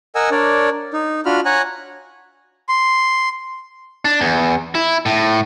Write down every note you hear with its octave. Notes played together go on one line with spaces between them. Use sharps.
A#4 D#5 F#5 G#5 E6
D4 A#4 C#5 D5
D#4
D4 F4 F#4 B5 F6
C#5 F#5 G#5 A#5 F#6
C6
D4
E2
E4
A2